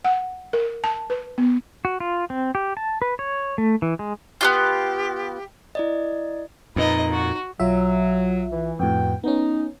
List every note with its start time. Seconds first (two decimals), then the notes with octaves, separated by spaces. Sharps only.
0.05 F#5
0.53 A#4
0.84 A5
1.10 B4
1.38 B3
1.85 F#4
2.00 F4
2.30 C4
2.55 G4
2.77 A5
3.02 B4
3.19 C#5
3.58 A3
3.82 E3
3.99 G#3
4.41 B3 D4 F4 G4
5.75 E4 D5 D#5
6.76 F2 A#2 D#4 B4 D#5
7.11 F#4
7.60 B1 F#3 F4 E5
8.52 E3
8.79 F2 A2 B3 F#4 G5
9.24 B3 C#4 D#4